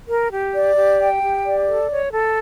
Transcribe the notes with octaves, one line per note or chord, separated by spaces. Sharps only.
A#4
G4
D5
G4
G5
G4
D5
A4
C#5
A4